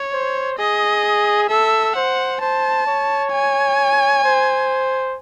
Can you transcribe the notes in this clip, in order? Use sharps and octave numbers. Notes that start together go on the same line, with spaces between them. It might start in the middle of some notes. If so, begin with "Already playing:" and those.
Already playing: C#5
C5
G#4 D#5
A4 E5
C5 F#5
C5 A5
C#5
G#5
C5